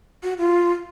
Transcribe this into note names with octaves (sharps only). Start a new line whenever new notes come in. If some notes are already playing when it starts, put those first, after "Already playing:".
F#4
F4